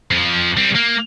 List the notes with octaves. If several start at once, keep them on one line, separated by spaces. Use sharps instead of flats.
F2 F3
G3 C4
A#3